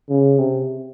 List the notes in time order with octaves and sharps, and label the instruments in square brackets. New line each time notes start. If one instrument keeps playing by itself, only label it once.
[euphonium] C#3
C3